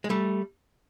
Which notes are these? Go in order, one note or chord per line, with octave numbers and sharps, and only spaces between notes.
G#3
G3 A3